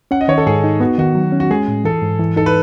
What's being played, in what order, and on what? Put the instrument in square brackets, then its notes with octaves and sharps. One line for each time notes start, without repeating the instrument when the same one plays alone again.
[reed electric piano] C#4 [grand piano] F#5
[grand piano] D#5
[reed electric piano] D#3 [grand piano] C#5
[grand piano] A4
[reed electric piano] G#2 [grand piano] G#4
[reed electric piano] D#4
[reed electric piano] B3 [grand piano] F#4
[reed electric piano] D#3 [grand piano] F#4
[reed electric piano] F#3
C#4
[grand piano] F#4
[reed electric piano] G#3 [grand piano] G#4
[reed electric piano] A2
[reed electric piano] E3 [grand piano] A4
[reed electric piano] G#2
E3
[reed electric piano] D#4 [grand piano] A4
[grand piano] B4